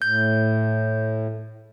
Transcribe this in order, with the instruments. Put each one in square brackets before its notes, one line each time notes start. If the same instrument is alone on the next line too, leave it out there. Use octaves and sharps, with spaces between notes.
[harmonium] A2 [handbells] G6